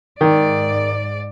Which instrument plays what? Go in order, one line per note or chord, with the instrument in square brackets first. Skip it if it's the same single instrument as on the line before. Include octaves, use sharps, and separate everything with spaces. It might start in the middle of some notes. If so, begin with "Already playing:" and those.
[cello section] G#2 D5 [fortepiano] D#3